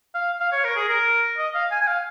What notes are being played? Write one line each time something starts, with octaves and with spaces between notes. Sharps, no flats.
F5
F5
C#5
A#4
G#4
A#4
D#5
F5
G#5
G#5
F5